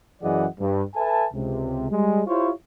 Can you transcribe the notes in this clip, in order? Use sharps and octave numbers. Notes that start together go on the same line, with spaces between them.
F#2 E3 G#4 D5 D#5 F#5
G2
A4 B4 E5 G#5 A5
C#2 C3
G3 G#3
E4 F4 G4 C5 C#5